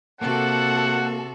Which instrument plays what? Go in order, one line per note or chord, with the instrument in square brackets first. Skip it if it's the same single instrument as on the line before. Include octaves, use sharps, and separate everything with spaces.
[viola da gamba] C3 F#4 [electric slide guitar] A#3 [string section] A4 [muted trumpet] F#5